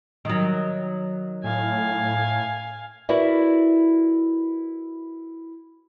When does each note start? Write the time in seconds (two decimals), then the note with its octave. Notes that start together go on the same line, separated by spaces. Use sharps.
0.25 D#3 F#3
1.44 A2 F5 G#5
3.09 E4 F#4 A#4 B4 D5 E5